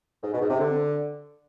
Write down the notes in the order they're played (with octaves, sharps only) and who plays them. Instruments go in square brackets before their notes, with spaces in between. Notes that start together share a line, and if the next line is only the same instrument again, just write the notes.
[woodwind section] G#2
B2
G#2
C3
D3